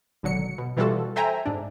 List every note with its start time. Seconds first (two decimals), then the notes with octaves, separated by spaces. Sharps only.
0.23 G#1 B2 D3 F#3 C#7
0.58 B2
0.77 B2 E3 G3 F4 F#4 A4
1.16 A4 C5 E5 G5 G#5 A#5
1.46 G#2 D4